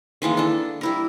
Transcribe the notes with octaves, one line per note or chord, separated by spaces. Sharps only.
D#3 E3 G#3 A#3
D4 A4
G3 E4 A#4